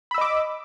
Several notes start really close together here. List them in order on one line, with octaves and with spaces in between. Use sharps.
B5 E6 D#5 D6